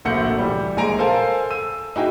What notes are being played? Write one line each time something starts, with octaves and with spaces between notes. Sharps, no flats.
D1 A#1 A3 F#5 G6 C#7
E3 G3
A#1 G#3 G#5 A#5 D7
A4 A#4 C5 F5 G#5 A5
E6 D#7
D#4 E4 F#4 G#4 G5